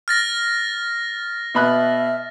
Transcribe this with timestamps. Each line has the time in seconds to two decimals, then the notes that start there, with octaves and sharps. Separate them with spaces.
0.08 F6 A6 A#6
1.55 B2 E5 B5 F#6